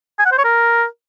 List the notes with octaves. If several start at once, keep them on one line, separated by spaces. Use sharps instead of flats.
G#5
F#5
C5
C#5
A#4